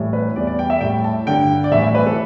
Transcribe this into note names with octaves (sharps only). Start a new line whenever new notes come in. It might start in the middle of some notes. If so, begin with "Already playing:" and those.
Already playing: A2 E3 G3
B4
E2 E3 G3 D5
D5
G5
E5
A2 G3 G5
A5
G2 D3 G3 G5
D5
A2 E3 G3 E5
E5
B4
A4